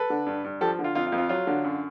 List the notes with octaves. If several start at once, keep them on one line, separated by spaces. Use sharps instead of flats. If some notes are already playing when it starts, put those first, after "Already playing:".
Already playing: A4 B4
D3
G2
G2
F3 G4 A4
D3
F4
F2 F4
F4
F2
F4
F#3 F4
D3
F#2